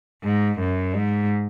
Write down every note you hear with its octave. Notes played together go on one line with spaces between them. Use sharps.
G#2
F#2
G#2